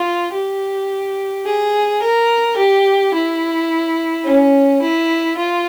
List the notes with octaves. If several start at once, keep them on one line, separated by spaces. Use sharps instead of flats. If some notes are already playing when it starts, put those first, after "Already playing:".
Already playing: F4
G4
G#4
A#4
G4
E4
C#4
E4
F4